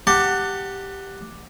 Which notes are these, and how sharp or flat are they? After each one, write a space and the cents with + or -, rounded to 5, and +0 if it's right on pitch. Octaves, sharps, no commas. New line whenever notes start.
G4 +0 F#5 +0 A5 +30